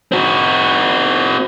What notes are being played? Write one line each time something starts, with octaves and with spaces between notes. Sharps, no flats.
C4 F#4